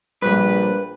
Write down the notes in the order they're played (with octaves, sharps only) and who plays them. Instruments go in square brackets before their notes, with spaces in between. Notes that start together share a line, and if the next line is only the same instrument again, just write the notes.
[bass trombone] A#1 [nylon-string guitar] G3 A#3 [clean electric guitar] B4